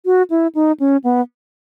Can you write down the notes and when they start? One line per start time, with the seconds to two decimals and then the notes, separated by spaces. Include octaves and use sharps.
0.05 F#4
0.30 E4
0.55 D#4
0.80 C#4
1.04 B3